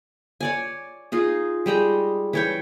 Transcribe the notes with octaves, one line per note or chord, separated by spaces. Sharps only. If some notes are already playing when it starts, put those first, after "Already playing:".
C#5 D5 G#5
D#4 F4 G#4
G3 G#3 G5 A#5
E3 C#5 G5